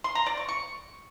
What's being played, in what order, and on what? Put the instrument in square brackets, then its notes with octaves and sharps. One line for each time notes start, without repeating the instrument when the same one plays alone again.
[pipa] C6
A#5
D5
C#6
C#6